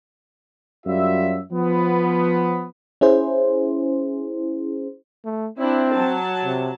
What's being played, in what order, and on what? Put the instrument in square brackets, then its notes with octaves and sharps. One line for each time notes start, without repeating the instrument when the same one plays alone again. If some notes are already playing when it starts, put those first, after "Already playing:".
[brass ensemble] F#2 F#3 G3 F4 E5
F3 B3
[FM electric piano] C#4 E4 G#4 C5
[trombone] A3
[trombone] C4 [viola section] D4 E4
[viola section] F#3 A5
[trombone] C3